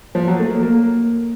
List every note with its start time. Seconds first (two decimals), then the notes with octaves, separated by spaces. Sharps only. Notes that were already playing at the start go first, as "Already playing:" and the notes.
0.15 F3
0.27 F#3
0.40 A3
0.51 A#3
0.63 A#3